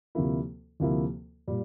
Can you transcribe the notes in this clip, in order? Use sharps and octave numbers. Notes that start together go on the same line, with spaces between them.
D2 C3 F3 A#3 E4
D2 C3 F3 A#3 E4
A#2 G3